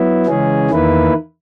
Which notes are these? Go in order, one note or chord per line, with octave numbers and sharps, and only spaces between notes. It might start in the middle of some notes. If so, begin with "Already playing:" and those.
Already playing: F#3 B3 E4
C#3 E3 G#3 C#4 G#4
E2 D#3 A#3 E4 B4